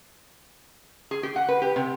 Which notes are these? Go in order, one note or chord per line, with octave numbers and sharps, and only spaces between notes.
G#4
G4
F#5
B4
G4
C3